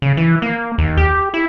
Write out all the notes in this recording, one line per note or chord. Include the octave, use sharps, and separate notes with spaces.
C#3
E3
A#3
D#2
G4
E4